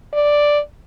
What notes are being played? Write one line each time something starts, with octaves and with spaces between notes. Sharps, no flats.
D5